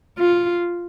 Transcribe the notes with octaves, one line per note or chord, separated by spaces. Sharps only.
F4